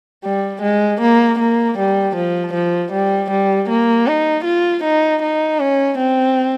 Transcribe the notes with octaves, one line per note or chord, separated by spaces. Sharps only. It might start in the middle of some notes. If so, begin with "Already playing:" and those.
G3
G#3
A#3
A#3
G3
F3
F3
G3
G3
A#3
D#4
F4
D#4
D#4
C#4
C4